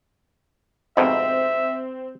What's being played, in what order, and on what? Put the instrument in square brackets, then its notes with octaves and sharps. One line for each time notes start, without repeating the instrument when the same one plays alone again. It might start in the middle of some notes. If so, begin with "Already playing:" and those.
[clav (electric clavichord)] F2 G#2 B2 [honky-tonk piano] C4 [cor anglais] E5